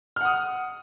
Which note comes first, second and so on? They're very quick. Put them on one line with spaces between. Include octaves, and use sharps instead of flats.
F6 F#5 D#6